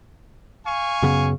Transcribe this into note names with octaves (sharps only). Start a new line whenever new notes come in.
F5 G#5 C#6
F#2 C#3 B3